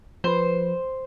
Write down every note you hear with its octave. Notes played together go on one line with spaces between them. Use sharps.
F3 B4 C5